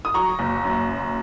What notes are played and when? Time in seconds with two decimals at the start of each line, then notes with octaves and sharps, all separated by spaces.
0.05 D#6
0.14 F#3 A#5 C#6
0.39 F#1
0.64 F#2